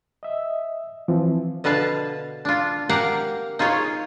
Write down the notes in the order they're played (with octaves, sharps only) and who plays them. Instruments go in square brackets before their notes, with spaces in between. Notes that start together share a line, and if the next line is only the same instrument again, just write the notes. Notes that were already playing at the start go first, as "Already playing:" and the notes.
[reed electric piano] D#5 E5
E3 F3 C4
[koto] B2 D3 B4 F5 A5
D4 F4
A#3 G4 A#4 F5 F#5 A#5
D#4 F4 G#4 C#5